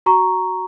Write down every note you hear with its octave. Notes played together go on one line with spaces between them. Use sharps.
F#4 A#5 C#6